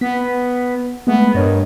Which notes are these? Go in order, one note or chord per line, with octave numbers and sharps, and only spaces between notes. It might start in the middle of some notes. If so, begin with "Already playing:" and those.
B3 B6
G#3 A3 B3
G2 A#4 C#5 D#5